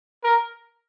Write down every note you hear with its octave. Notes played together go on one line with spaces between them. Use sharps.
A#4